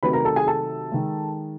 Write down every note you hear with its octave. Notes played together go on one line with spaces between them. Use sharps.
C3 D#3 F#3 A3 B4 B5
A#4 A#5
A4 A5
G#4 G#5
A4 A5
D#3 G#3